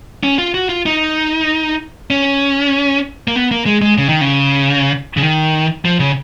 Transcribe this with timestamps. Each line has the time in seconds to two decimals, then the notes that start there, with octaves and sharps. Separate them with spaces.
0.23 C#4
0.38 F4
0.54 F#4
0.69 F4
0.86 D#4
2.10 C#4
3.28 A#3
3.36 B3
3.51 A#3
3.66 G#3
3.82 G#3
3.98 C#3
4.09 D#3
4.21 C#3
5.17 C#3
5.22 D#3
5.85 F3
6.00 C#3